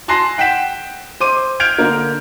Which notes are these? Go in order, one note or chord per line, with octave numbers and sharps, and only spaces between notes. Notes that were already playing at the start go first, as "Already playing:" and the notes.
G#5 A5 C6 F#6 A#6 C7
F#5 G5 B6 E7
C5 D6 D#7
F6 G6 G#6 D7 F7
D3 A#3 A#4